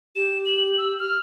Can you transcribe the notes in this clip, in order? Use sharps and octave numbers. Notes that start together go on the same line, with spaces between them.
G4 E7
F#7
E6
F6